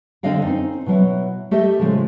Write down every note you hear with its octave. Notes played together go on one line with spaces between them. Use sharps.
D3 C4 D4 D#5 F5 G5
C4 C#4 D#4 C5
B2 F#3 E4
A3 G4 A4 D#5 E5
A2 C#3 F3 G#3 A3